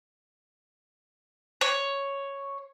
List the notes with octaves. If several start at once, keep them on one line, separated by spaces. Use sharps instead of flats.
C#5